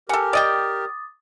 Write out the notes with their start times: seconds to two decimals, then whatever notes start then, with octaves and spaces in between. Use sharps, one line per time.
0.09 G4 A4 A#4 F#5 G#5
0.33 D5 D#5 G5 D6 D#6 A6